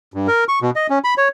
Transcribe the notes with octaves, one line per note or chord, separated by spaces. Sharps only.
G2
A#4
C#6
B2
D#5
C#4
B5
C#5